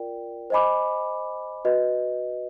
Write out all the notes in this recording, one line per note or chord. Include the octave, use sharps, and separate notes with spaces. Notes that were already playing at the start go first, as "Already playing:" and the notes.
Already playing: F4 A#4 D5 G5
C5 D#5 G#5 B5 D6
F#4 B4 D#5